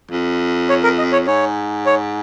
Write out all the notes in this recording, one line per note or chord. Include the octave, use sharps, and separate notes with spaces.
F2
C#5
A#4
D#5
C#5
G#2 C#5
C#5